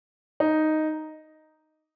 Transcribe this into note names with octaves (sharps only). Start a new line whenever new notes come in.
D#4